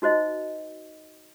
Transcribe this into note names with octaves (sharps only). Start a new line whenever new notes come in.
D#4 F#4 C5 D#5